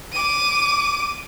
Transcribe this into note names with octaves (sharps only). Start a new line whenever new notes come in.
D6 D#7